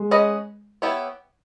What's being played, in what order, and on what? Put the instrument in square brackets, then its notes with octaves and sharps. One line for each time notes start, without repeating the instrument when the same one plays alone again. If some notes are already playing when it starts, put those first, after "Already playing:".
Already playing: [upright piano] G#3
[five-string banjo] C#4 G#4 B4 D#5
B3 E4 G4 C#5